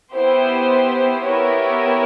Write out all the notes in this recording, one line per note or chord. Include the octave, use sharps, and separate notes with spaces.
B3 E4 G4 C5
B3 E4 G4 A#4 C#5